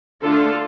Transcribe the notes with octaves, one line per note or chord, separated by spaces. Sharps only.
D3 A3 D4 F4 A4